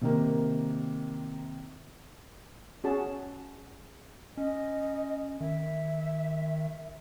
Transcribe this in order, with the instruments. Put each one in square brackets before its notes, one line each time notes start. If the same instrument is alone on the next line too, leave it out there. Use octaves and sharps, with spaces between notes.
[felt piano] C3 D#3 A#3
[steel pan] C#4 F#4 G#4 A5
[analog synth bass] C#4 [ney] D#5
[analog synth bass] D#3 [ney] E5